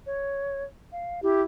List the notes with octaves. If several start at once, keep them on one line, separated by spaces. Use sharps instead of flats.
C#5
F5
E4 G4